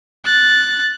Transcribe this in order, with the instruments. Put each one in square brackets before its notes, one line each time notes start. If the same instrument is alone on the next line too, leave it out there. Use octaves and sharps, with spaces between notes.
[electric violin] F#6 A6